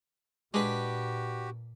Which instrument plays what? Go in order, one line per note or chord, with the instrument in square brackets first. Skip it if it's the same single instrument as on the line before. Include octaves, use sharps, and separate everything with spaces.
[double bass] A#2 [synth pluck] G#3 [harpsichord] D4 B4 [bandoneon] F#4 G4